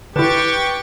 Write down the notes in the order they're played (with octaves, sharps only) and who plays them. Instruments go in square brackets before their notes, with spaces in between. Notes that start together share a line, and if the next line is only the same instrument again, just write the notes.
[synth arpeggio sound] D3 E4 [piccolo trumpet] G4 [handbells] B4 [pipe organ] G5 C#6 A6